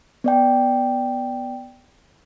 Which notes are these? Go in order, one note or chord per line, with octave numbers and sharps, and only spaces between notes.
B3 D5 G5